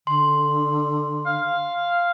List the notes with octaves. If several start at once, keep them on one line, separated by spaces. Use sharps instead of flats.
D3 C6
F5